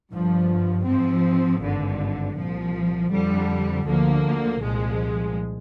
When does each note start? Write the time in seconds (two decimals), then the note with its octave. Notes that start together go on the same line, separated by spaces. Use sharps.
0.12 G1 G2 F3
0.86 G#2 F3 C4
1.61 G#1 G2 D3
2.36 C2 A#2 F3
3.11 F2 D3 G3
3.85 D2 D3 F3 A#3
4.60 C2 A#2 F3 G#3